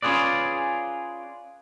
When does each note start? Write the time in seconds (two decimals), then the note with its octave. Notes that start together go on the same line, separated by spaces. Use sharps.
0.02 C#4 F4 G#4 B4 D5